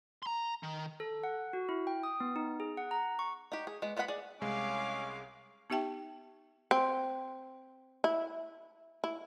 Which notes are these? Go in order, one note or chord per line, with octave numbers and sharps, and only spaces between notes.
A#5 C6
D#3
A4
F#5
F#4
E4
G5
D#6
B3
D#4
G#4
F#5
A#5
C#6
D#4 F#4 G4
G#4
G#3 B3
G#3 B3 D#5 F#5 B5
G#4 D5
C2 G#3 C#4 F5 D6
B3 D#4 G4 E5 G5 A5
C4
E4
E4